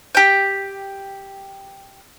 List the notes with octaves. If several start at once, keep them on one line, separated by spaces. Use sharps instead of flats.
G4 G5